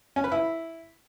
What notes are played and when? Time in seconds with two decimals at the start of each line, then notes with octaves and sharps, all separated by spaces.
0.16 C#4
0.24 B4
0.32 E4